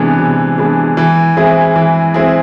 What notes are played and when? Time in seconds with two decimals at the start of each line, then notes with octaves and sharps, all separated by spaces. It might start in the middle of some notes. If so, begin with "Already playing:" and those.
Already playing: C3 E3 G#3 B3 D4
0.19 C3
0.58 E3 G#3 B3 D4
0.97 E3
1.37 G#3 C4 E4 G#4
1.76 E3
2.14 G#3 C4 E4 G#4